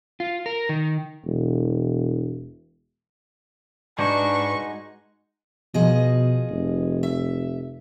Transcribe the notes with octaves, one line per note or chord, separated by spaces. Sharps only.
F4
A#4
D#3
E1
G#2 G#3 D4 D#4 F#4 B4 C#6
B2 F3 G#4 D#5
F1
E5